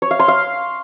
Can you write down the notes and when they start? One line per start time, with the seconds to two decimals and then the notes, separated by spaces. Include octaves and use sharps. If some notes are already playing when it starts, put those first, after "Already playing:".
0.02 C#5
0.11 F5
0.19 C6
0.28 F5